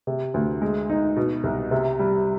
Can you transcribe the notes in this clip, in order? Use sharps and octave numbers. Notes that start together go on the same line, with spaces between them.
C3
D2
G#3
D#4
B2
C2
C3
G3